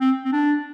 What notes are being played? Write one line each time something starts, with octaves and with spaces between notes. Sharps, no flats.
C4
C4
D4